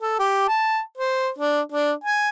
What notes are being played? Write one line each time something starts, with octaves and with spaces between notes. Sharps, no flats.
A4
G4
A5
C5
D4
D4
G#5